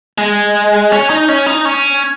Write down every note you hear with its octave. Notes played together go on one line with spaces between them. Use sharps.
G#3
C#4
D#4
C#4
D#4
C#4